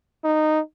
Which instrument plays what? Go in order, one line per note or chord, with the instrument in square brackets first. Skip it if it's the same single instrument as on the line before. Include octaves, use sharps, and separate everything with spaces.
[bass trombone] D#4